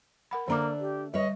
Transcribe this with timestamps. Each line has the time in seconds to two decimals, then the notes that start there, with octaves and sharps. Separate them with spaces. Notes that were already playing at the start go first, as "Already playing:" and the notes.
0.31 A#4 F#5 B5
0.48 D3 A3 A#3 D4 A#5 D6
0.80 G4
1.14 G3 B4 C#5 D#5